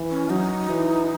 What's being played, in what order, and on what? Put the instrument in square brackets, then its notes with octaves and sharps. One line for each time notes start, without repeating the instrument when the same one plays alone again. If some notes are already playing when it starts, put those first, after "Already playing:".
Already playing: [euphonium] E3
[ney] C#4
[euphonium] F#3 [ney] D#4
[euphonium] E3